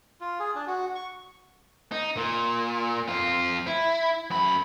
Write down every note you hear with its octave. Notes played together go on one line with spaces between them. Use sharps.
F4
G#4
D4
F#4
C#6
D#4
A#2
F2 F4
E4
F#2 B5